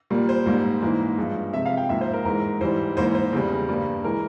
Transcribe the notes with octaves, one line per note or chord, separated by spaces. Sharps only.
A#2 G3 A#3
C5
G#2 G3 A#3
G#2 E3 A#3
G2 F3 G#3
C3 F3 G#3 E5
F5
G5
G#2 F3 A#3 E5
C5
A#4
G#2 E3 G#3 A#4
G#2 E3 G3 C5
G#2 E3 A#3 C5
C5
E2 C#3 G3
G2 G3 A#3
E3 G#3 A#4